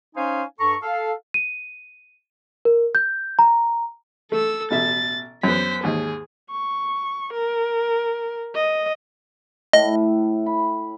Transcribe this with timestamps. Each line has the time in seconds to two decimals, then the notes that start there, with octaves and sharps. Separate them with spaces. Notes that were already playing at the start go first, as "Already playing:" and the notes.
0.16 C#4 D#4 C5 F5 G#5 C6
0.59 G2 A4 A#5 C#6
0.82 A4 F5
1.34 D#7
2.65 A#4
2.95 G6
3.39 A#5
4.32 A3 A4 E6
4.71 A1 B2 E5 A6
5.43 F#2 B3 C5 B6
5.83 D#2 G#2 G#4
6.51 C#6
7.33 A#4
8.55 D#5
9.73 A2 D#5
10.46 B5